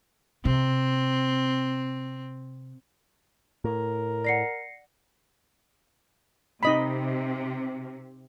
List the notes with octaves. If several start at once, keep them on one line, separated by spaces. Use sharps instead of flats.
C3 C4
A2 A#4
D5 F#5 A#6 C7 C#7
C3 D#4 D#5 B5